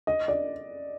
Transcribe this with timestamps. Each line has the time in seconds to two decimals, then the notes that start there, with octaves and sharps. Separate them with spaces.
0.07 D#5
0.28 D5